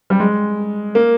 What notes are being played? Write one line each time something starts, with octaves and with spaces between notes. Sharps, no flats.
G3
G#3
A#3